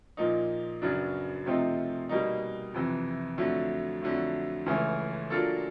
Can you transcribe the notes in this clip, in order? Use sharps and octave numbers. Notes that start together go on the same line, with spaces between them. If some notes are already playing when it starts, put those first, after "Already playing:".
A#2 F3 A#3 D#4
F#2 C#3 F#3 B3 D4
C3 F3 A3 C4 D#4
B2 G3 A#3 D#4
F2 C3 E3
F2 D3 F#3 A3
F2 D3 F#3 A3
C#2 C#3 E3 A3 C#4
F#3 A#3 D4 F4 A4